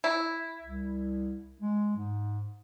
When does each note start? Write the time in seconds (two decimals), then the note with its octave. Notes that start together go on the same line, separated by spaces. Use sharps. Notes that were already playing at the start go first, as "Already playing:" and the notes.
0.04 E4
0.62 C2
1.61 G#3
1.96 G#2